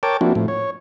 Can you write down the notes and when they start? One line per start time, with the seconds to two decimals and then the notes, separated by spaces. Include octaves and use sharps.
0.03 A#4 C#5 G5 A5 D6
0.21 F3 A#3 C4 D4 E4 F#4
0.35 A2 F3
0.48 C#5